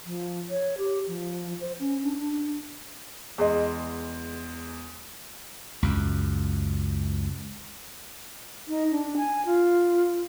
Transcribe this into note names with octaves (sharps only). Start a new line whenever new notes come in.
F3
C#5
G4
F3
C5
C#4
D4
D4
E2 G#3 G#4 D#5 C6
C#2 F#2
D#4
D4
G#5
F4